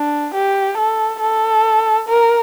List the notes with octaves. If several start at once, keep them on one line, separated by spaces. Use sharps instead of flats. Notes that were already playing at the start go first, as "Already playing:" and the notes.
Already playing: D4
G4
A4
A4
A#4